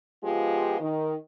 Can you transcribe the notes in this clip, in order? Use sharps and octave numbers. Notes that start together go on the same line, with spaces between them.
F3 G#3 B3 F4 G4
D#3